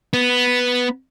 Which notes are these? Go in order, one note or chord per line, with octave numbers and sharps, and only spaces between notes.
B3